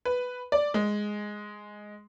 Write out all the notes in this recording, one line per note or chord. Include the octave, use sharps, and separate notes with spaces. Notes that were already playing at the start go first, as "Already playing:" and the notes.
B4
D5
G#3